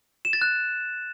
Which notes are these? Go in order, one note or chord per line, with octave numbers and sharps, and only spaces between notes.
E7
A6
F#6